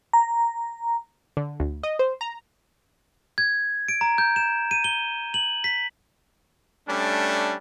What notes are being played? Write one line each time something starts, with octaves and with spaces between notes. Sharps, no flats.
A#5
D3
D2
D#5
C5
A#5
G#6
D7
A#5
G6
E7
D#7
G7
F#7
B6
G3 A3 C#4 D4